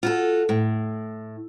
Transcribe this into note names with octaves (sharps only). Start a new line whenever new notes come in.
F4 F#4 A4
A2